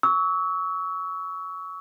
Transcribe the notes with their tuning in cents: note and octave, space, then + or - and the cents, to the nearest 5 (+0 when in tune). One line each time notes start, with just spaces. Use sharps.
C#6 +25 E6 -25